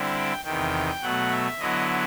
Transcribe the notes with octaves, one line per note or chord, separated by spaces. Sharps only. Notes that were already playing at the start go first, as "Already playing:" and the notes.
Already playing: D3 G3 C4 E4
G5
E2 C3 D#3 G5
B2 F#3 A3 F#5
E5
D3 F#3 B3 E4 D#5